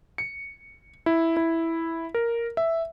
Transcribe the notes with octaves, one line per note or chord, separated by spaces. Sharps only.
C#7
E4
E4
A#4
E5